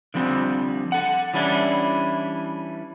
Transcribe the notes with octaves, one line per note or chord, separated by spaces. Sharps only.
D3 F3 G3 C4
A4 F#5
E3 G3 C#4 D4 E4